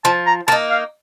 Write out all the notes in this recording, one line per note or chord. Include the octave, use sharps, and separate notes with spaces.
F3 A5
A#5
A#3 D#4 A5
F5